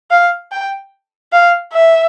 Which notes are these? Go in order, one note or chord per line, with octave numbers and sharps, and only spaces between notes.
F5
G5
F5
E5